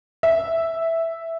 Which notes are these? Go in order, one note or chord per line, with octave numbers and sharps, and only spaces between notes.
E5